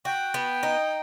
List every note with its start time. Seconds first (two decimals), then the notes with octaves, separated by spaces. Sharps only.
0.05 F#4 G5
0.34 B3
0.63 D#4